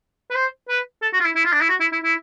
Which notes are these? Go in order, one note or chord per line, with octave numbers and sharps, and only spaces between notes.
B4
C5
B4
A4
F#4
F4
E4
E4
F4
D4
E4
F#4
E4
E4
E4